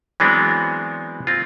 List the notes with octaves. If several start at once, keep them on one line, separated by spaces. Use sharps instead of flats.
E3 F#3 G#3 B3 C4 D4
C4 F4